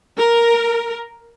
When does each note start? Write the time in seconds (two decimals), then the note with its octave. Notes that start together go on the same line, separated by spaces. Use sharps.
0.18 A#4